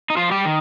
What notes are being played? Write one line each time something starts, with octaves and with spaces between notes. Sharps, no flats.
D#4
F3 F4
G3 G4
D#3